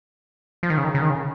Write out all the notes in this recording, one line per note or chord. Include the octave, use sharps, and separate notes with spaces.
F3
D#3
C#3
D#3
C#3
D#3
C#3